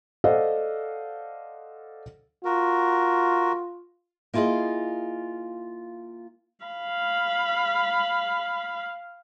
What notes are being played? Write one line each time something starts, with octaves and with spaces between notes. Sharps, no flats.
A4 C5 D5 D#5 F5 F#5
F4 F#4 A#4
A#3 E4 F4 G4 G#4 D#5
F5 B5